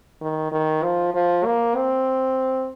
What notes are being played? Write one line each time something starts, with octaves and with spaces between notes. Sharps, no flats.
D#3
D#3
F3
F3
A#3
C4